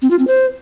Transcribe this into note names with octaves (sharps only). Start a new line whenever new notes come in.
C4
F4
C4
C5